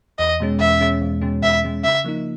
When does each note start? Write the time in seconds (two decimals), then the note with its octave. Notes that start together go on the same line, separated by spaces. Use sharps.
0.19 E2 D#5
0.40 B2 G#3 C#4
0.60 E2 E5
0.80 B2 G#3 C#4
1.01 E2
1.22 B2 G#3 C#4
1.43 E2 E5
1.64 B2 G#3 C#4
1.84 C#3 E5
2.05 F3 A#3 D#4